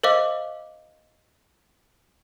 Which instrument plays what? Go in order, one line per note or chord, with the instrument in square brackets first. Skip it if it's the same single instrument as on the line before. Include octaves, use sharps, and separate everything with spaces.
[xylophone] A#4 C5 D#5 F5 D6